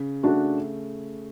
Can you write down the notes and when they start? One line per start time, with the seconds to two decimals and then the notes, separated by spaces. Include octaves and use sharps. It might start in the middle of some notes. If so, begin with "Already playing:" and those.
Already playing: C#3
0.23 A3 D4 F#4